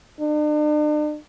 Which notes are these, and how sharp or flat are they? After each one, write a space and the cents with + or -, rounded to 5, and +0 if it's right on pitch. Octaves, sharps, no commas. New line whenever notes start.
D4 +45